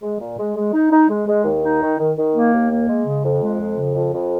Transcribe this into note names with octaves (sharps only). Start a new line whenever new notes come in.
G#3
A#2
G#3
G#3
D#4
D#4
G#3
G#3
D#2
D#4
D#3
D#3
D#3
A#3
D#2
A#3
G#3
C#3
F2
G#3
F2
C#3
F2
F2